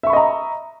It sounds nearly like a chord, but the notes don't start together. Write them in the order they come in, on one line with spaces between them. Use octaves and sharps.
E5 C#6 B5 D#5 A#5